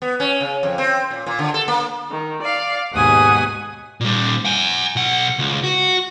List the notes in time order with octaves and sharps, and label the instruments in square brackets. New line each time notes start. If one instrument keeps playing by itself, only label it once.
[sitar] B3
C#4
C#3
F2
C4
A#2
A#2
D3
A4
A#3
[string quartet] D#3
D5 F5
D#2 G#2 B2 F#5 G#5 D#6
[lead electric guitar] A#2 G3
F#5 G#5
B1 F#5
C#2
F#4